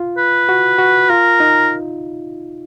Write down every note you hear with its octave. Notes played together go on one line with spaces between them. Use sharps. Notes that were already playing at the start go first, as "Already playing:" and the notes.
Already playing: F4
B4
F#4
F#4
F4 A#4
D#4